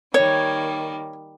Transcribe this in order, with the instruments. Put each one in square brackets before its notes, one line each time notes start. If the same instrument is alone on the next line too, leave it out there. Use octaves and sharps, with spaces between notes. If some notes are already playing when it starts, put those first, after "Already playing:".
[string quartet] D#3 G3 A#3 [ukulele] C#5